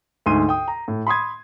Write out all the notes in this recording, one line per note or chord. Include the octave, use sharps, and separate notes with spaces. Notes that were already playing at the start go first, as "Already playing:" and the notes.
D2 G#2 C6 D#7
G5 D#6
A#5
A2
B5 C6 D#6 G#6